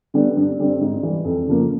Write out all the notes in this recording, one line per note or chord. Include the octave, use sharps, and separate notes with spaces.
D3 G3 B3
G2
D3 G3 C4
G#2
E3 G3
F2
C#3 F3 A#3